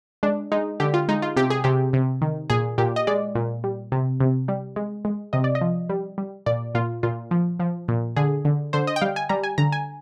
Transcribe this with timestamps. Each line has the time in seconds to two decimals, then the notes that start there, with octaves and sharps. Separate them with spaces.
0.23 G#3 D4
0.52 G#3 D#4
0.80 D3 G4
0.94 F4
1.09 G#3 D#4
1.22 F4
1.36 C3 G4
1.50 G#4
1.64 C3 G4
1.93 C3
2.22 D#3
2.50 A#2 G#4
2.78 A#2 G4
2.96 D#5
3.07 G#3 D5
3.35 A#2
3.64 G3
3.92 C3
4.20 C3
4.48 G3
4.76 G#3
5.05 G#3
5.33 C3 D#5
5.44 D5
5.55 D#5
5.61 F3
5.89 G3
6.18 G3
6.46 A#2 D5
6.75 A#2 F4
7.03 A#2 F4
7.31 F3
7.60 F3
7.88 A#2
8.16 D3 G#4
8.45 D3
8.73 D3 C5
8.87 D#5
8.96 G5
9.02 G3 F5
9.16 G#5
9.29 G3 A#5
9.43 G#5
9.58 D3 A#5
9.72 G#5